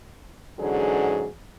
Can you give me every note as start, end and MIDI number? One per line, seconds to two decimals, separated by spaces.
0.59 1.28 44
0.59 1.28 50
0.59 1.28 52
0.59 1.28 54
0.59 1.28 61
0.59 1.28 68